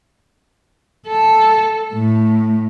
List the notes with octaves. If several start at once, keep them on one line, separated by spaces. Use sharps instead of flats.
A4
A2